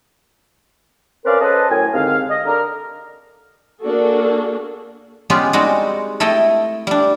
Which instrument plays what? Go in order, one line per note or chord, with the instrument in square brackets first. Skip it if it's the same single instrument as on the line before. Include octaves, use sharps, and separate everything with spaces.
[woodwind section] C4 C#4 A#4 B4 D5 F5
C#4 A4 B4 C5 D#5 A5
F#2 A2 G5 G#5
D#2 G#2 D3 C4 F5
D#5
D3 G4 A#4
[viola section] A#3 D4 F#4 G#4 A4
[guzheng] G#3 B3 C#4 F4 G4
G3 G#3 C4 D#4 F#4
A3 E4 A4 D#5 G5
G3 D4